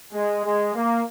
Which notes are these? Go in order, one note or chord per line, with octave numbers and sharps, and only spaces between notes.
G#3
G#3
A#3